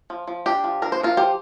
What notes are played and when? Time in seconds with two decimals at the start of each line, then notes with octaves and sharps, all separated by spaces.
0.10 F3
0.27 F3
0.46 D4 G4
0.64 F3
0.82 D4 A#4
0.92 C5
1.00 F3 F4 A#4
1.17 F3 G4 C5